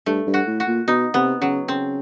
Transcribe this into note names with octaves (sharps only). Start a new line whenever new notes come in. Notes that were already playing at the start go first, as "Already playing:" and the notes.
G2 A3
G2
F#4
A2
F#4
A#2
B2 D#4
C3 B3
C#3 F#3
C#3 C4